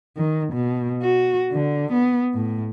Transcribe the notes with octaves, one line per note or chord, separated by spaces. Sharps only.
D#3
B2
F#4
D3
B3
A2